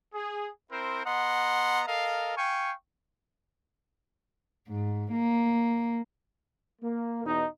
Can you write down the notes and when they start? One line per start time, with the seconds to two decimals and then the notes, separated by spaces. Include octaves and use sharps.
0.14 G#4
0.71 C4 E4 A#4 C5
1.05 B3 D#5 F#5 A#5 C6
1.87 A4 A#4 D#5 F5
2.37 F5 G5 G#5 C#6
4.68 G#2
5.12 A#3
6.82 A#3
7.25 E2 B2 D#4